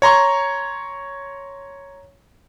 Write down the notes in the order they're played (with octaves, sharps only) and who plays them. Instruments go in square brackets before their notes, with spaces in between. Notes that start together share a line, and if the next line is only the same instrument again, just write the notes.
[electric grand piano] C#5 A#5 C6 C#6